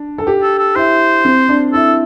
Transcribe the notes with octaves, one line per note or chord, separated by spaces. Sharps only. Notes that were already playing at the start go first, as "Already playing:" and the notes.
Already playing: D4
A4
G4
A4
A4
E4 C5
C4
D4
E4 A4